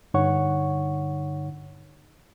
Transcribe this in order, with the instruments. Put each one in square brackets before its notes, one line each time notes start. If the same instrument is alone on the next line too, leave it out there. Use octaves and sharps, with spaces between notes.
[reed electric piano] G2 D3 D#4 C#5 F#5 C#6